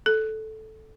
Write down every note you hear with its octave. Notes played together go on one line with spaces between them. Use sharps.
A4